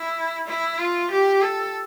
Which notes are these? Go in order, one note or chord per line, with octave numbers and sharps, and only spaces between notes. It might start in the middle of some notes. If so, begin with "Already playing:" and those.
Already playing: E4
E4
F4
G4
A4